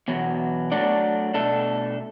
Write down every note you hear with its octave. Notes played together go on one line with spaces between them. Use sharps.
E2 B2 F#3
F#3 A3 D4 A4 D5
B2 A3 D4 A4